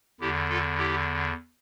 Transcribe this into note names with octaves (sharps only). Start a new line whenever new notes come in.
E2 D3 E4 G4
F4 A4
E4 G4